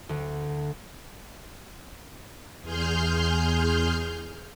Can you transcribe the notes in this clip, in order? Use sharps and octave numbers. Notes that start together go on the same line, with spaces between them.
D2
E2 G#4 C6 F6 G6